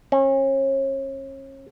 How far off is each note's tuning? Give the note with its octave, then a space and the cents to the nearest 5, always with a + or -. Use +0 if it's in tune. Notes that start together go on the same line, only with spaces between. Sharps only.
C#4 -35